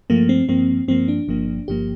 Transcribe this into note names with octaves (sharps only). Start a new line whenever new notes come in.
G2 F3 A3 A#3
C4
G2 F3 A#3 C4
G2 F3 A#3 C4
D4
G1 G2 F3 A#3
G1 G2 F3 A#3 G4